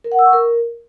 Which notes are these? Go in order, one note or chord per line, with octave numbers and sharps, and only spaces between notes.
A#4
F#5
E6
C#6
A#4